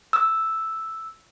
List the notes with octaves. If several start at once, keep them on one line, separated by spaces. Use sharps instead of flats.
E6